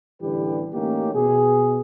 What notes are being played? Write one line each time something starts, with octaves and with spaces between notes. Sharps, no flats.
A1 D3 E3 G3 G4 B4
A1 A2 A#3 C#4 D#4 G4
B2 G#4